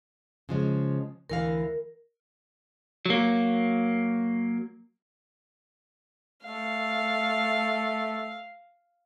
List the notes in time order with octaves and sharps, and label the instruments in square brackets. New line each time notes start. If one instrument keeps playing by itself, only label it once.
[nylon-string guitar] C#3 F3 G#3
[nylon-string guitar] D2 E3 F5 [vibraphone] A#4
[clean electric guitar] F#3 A#3
[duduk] A3 [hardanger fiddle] F5